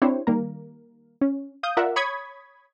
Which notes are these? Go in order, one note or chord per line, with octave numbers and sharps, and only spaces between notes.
C4 D4 E4 G4 C5 C#5
D#3 G3 A#3 A#4
C#4
F5 D#6 G6
F4 A#4 D5 E5 F#5
C#5 B5 C#6 D#6 G#6 B6